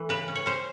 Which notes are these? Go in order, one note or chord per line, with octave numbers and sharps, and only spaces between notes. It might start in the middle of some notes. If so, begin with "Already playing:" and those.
Already playing: E3 A3
C#3 B4
C#4
C#5
C#4 C5